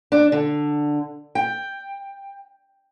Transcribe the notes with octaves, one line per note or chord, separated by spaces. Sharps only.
D4
D3
G5